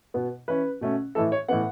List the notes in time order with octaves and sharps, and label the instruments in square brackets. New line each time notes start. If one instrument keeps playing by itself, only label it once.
[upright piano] B2 B3
E3 C#4 B4
B2 A3 C#4
A2 E3 A3 A4
C#5
A2 E3 B3 F#5